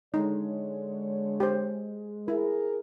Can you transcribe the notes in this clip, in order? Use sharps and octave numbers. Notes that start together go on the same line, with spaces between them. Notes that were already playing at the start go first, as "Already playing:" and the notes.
D3 G#3 D#4 C#5
G4 C5
E4 G#4 A#4